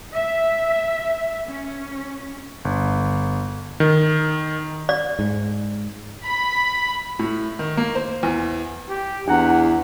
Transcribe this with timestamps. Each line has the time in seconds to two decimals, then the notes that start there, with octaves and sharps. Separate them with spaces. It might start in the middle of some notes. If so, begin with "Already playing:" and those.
0.15 E5
1.48 C#4
2.65 G1
3.80 D#3
4.89 D5
5.19 G#2
6.24 B5
7.19 A2
7.59 D#3
7.77 A#3
7.95 C5
8.23 E2
8.89 G4
9.28 E2 D4 E4 F#5